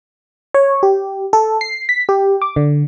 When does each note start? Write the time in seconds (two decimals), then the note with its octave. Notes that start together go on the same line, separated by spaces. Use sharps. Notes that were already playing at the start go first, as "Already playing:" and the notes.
0.54 C#5
0.83 G4
1.33 A4
1.61 C7
1.89 B6
2.09 G4
2.42 D6
2.56 D3